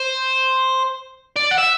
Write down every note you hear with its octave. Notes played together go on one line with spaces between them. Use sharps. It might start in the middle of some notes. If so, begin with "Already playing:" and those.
Already playing: C5
D5
F#5
E5